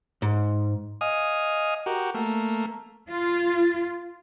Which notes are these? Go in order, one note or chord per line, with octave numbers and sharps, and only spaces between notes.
G#2
D#5 F5 G#5 D#6
F#4 G4 A#4
A3 A#3
F4